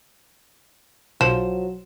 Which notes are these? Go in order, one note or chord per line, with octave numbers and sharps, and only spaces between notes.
B1 F3 F#3 E7